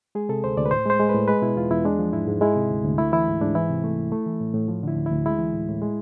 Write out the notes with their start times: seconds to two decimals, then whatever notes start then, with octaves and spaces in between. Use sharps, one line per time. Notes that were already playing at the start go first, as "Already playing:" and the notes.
0.15 G#3 G#4
0.29 C3 A4
0.44 D2 C5
0.57 D2 D5
0.66 B4
0.71 A2 C5
0.86 G#3 C5
1.00 G#3
1.09 A2 B4
1.28 G#3 B4
1.42 B2 E4
1.56 E2 F4
1.71 E2 E4
1.85 G#3 D4
1.99 F3
2.13 G#2 E4
2.27 G#2
2.41 G#3 E4
2.56 C3
2.70 D2
2.84 D2
2.98 A3 E4
3.12 E3 E4
3.27 G#2
3.41 G#2 D4
3.55 E3 E4
3.70 C3
3.84 A3
3.97 C2
4.12 A3
4.26 E3
4.40 A2
4.54 A2
4.68 F3
4.83 D3 E4
4.97 D2
5.06 E4
5.11 D2
5.26 G#3 E4
5.39 E3
5.53 A2
5.68 A2
5.82 G#3